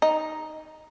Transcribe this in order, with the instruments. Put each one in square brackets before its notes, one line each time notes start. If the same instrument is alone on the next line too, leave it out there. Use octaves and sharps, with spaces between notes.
[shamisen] D#4